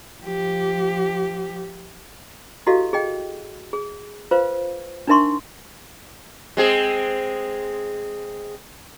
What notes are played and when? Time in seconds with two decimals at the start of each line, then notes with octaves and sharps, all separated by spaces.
0.24 F3 G4
2.67 E4 F#4 G4 A4 D#5 F5
2.93 G#4 D#5 G5
3.73 G#4
4.31 F4 B4 C5 F5
5.07 D4 D#4 A#4 E5 C6 C#6
6.57 G#3 C4 G#4